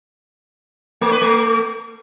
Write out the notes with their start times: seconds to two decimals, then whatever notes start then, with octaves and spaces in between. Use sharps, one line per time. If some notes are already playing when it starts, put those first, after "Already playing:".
1.01 A3
1.11 B4
1.21 A3